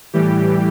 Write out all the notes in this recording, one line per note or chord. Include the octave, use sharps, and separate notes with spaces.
A2 E3 G3 G4